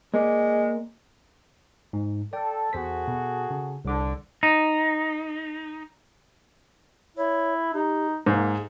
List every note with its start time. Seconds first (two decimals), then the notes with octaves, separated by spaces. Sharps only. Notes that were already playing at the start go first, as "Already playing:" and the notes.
0.14 G#3 A#3 D5
1.93 G#2
2.33 A4 D5 G5
2.73 E2 F#4 G#4 A4 C5 B6
3.08 B2
3.51 C#3
3.85 C2 D3 D6
4.43 D#4
7.17 E4 C#5
7.74 D#4 G4
8.26 G#2 A#3 G#4